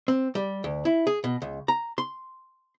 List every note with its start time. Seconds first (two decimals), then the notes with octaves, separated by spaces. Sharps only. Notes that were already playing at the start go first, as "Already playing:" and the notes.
0.08 C4
0.35 G3
0.64 D2
0.85 E4
1.07 G#4
1.24 B2
1.42 C#2
1.68 A#5
1.98 C6